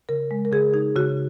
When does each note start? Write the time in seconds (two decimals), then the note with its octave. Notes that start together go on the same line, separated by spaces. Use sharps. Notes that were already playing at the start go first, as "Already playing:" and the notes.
0.09 C#3 A#4
0.31 G#3
0.45 A#4
0.52 C#3 G#4
0.74 D#4 G#4
0.96 C#3 F#4